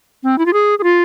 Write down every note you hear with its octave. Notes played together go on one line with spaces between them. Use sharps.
C4
E4
F4
G#4
G#4
F4